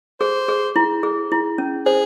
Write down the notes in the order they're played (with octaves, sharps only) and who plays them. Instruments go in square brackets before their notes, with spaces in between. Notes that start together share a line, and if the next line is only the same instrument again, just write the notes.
[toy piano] G#4 [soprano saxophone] C5
[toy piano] G#4
E4
G#4
E4
C#4
[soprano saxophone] G#4 [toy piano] C5